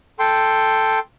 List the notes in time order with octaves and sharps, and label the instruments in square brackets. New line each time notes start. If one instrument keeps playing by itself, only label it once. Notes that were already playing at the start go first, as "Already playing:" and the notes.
[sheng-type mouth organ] A4 G5 C6